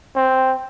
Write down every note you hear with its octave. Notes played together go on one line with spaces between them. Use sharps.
C4